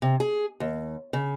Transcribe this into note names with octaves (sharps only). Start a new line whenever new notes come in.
C3
G#4
D#2
C#3